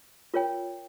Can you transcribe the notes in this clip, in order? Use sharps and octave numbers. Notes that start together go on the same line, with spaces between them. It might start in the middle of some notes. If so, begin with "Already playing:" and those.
F4 A#4 C#5 G5